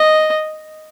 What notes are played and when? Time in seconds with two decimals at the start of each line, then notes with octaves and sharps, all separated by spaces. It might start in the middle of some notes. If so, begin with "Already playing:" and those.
Already playing: D#5